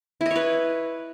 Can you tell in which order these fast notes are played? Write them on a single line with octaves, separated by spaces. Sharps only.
E4 D#5 C#5 B4